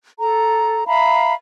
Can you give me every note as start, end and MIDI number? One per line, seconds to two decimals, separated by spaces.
0.19 0.86 69
0.19 0.86 82
0.87 1.33 76
0.87 1.33 77
0.87 1.33 82
0.87 1.33 83